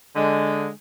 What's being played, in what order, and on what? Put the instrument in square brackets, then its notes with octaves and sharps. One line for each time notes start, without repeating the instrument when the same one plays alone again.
[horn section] D3 G#3